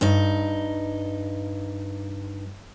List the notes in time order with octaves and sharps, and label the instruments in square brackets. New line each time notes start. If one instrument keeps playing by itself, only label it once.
[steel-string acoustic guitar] G2 D#4